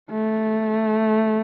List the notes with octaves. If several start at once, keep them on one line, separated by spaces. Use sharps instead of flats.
A3